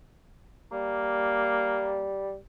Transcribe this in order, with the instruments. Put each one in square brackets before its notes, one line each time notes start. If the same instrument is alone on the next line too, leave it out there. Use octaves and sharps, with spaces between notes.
[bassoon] G3 [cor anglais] A#3